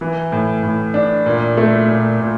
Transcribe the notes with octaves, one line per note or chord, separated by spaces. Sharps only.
E3
A2
A2
D4
A#2
A3
A#2
A#2